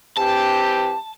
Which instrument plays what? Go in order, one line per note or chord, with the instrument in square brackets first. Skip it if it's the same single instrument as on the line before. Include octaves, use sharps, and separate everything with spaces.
[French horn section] E3 C4 G4 [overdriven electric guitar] A5